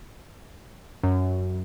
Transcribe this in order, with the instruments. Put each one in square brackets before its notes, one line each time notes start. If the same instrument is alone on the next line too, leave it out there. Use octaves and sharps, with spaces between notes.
[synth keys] F#2